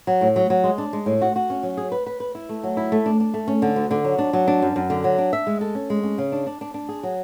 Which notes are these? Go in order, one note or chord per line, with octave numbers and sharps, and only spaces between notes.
F#3
A2
F#3
F#3
G#3
D4
G#3
A2
F#4
F#4
C#4
F#3
G#4
B4
B4
B4
E4
A3
F#3
E4
A3
D4
D4
A3
C#4
D3
D2
D3
F#3
D4
F#3
D4
F#2
F#2
D3
F#3
D4
E5
G#3
A4
C#4
G#3
C#4
C#3
D4
D4
D4
D4
G#4
F#3